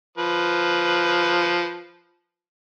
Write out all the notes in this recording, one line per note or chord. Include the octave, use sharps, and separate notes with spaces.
F3 B4